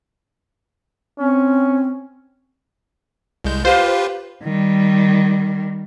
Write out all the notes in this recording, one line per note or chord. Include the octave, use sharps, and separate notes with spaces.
C4 C#4
C2 G#3 G6
F4 G4 B4 C5 F5
D#3 G3